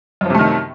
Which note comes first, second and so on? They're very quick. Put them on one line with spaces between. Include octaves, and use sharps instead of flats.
F#2 F3 C3 A3 D#3